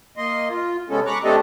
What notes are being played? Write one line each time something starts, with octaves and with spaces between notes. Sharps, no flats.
A#3 D#5 C6
F4
C3 G#3 B3 C#4 A4
A#5 B5 C#6 D6 F#6
A3 C4 D4 G4 A4 D#5